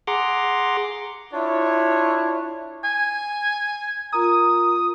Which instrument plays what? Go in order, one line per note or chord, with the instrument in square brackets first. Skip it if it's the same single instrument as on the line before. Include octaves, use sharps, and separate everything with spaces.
[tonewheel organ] G#4 F#5 A#5 C6 D6
[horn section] D4 E4 F4 C#5
[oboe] G#5
[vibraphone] F4 A#4 A#5 [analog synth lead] D#6